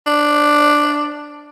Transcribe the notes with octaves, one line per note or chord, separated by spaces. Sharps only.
D4